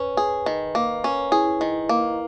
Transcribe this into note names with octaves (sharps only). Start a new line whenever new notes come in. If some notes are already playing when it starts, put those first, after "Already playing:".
Already playing: C#4 B4
G#4
D#3
A#3
C#4
E4 G#4
D#3
A#3